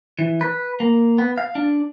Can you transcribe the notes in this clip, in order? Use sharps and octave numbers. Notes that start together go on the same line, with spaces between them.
E3
B4
A#3
B3
F5
D4